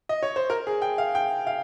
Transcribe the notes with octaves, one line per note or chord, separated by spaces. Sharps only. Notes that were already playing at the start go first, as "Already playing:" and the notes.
D#5
C#5
C5
A#4
G#4
G5
F5
G5
F5